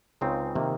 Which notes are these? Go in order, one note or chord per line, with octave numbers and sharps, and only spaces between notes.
C#2 C#3 G#3 C4 D#4
C3 D#3 A#3